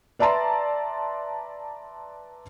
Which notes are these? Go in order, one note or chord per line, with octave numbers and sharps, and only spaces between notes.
B4 D5 E5 A5 A#5 C6